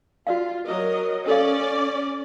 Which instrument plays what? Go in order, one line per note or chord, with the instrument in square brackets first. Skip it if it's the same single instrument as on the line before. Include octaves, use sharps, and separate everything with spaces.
[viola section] F4 [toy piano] F#4 D5 F5
[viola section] F#3 A#4 D#5
[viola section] C#4 D5 [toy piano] A4 F5